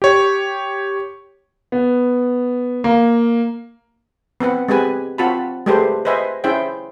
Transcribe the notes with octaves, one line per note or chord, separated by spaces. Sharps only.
G4 C#5
B3
A#3
B3 C4 B4 F#5
G#3 C4 G4 B4 G#5
C4 F4 F#4 A5 B5
G#3 A3 G4 A4 B4 C5
B4 C5 D#5 E5 G#5
C#4 E4 G#4 C5 E5 G5